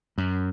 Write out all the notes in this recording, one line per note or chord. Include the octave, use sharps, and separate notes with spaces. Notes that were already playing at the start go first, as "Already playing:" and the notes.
F#2